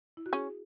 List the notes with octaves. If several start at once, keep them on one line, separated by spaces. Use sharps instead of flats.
E4
F#4
C#4 G#4